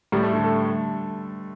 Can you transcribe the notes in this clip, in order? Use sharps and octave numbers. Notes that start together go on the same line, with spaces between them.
A2 G3
A3
D3 G3
A4